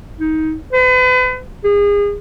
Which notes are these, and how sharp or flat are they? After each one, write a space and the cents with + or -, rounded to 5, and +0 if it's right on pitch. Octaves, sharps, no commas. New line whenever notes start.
D#4 +20
B4 +40
G#4 -30